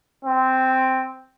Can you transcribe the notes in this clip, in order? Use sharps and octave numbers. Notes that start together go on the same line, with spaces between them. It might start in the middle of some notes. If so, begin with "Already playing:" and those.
C4